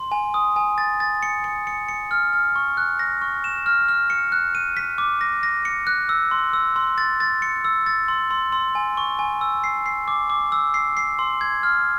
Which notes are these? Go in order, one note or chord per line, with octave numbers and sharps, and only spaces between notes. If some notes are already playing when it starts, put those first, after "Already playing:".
Already playing: C6
G#5
D#6
G#5
A6
A6
C#7
C#7
C#7
C#7
F6
F6
C#6
F#6
A#6
C#6
E7
F6
F6
C#7
F#6
D#7
B6
D6
A#6
A#6
C#7
F#6
E6
C6
E6
C6
A6
A6
C#7
E6
A6
C6
C6
C6
G#5
C#6
G#5
E6
C7
C7
D6
D6
E6
C7
C7
C6
G#6
F6